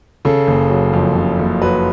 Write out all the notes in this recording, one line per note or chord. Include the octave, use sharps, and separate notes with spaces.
C#3 A4
F#1
F#3
F2
C#3
F#1
F#3 B4